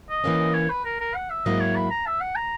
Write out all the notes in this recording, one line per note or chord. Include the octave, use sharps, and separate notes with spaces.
D#5
E3 A#3 C#4
C#5
B4
A#4
A#4
F#5
E5
G#2 F#3 A#3 E4 D#5
C#5
B5
A#5
E5
F#5
A#5